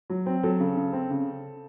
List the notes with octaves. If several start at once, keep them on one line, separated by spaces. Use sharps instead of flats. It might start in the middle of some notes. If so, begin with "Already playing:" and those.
F#3
C4
F#3 A4
C#3
C#3
C4
C#3